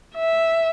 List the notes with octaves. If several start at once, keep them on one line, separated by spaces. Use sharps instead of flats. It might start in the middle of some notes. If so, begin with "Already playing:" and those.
E5